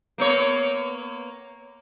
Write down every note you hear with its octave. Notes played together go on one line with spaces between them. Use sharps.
A#3 B3 C#5